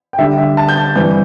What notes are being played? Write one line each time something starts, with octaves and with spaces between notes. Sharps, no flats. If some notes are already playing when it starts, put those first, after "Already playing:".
G5
D3 G3 D4 E5
E5
A5
G6
A6
G2 E3 C4 E4 G6